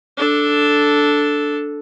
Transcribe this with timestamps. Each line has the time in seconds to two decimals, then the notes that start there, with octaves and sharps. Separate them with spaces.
0.17 D4 A4